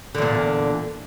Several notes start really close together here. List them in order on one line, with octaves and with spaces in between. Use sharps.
D3 E2 A#2